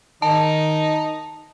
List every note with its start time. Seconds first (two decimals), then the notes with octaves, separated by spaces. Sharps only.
0.22 D#3 D#4 A5